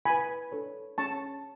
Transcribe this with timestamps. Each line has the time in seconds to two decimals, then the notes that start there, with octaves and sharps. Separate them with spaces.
0.05 E4 B4 G#5 B5
0.52 D4 A4 C#5
0.98 C#4 G#4 C#5 A5 C#6